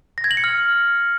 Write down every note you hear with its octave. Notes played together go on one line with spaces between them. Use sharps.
A#6
G#6
F#7
C#7
F6